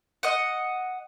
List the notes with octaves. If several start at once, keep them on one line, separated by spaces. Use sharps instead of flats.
D#5 F#5